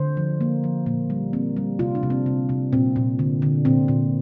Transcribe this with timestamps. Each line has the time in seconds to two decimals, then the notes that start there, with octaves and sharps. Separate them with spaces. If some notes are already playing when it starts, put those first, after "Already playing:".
Already playing: D3 C5
0.17 F3
0.41 A#3
0.64 F3
0.86 A#2 A#3
1.10 G3
1.33 A#3 C4
1.57 G3
1.79 C3 F4
1.95 D4
2.03 C3
2.10 C4
2.26 C3
2.49 C3
2.73 A#2 C4
2.96 A#2
3.19 D3
3.42 D3
3.65 A#2 C4
3.88 A#2